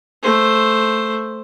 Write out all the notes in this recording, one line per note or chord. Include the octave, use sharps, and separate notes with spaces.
A3 C5